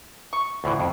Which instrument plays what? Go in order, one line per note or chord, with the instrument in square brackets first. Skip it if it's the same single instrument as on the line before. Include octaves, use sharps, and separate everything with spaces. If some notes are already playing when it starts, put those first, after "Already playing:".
[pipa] C#6
[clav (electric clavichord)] D2 A2 E3
F2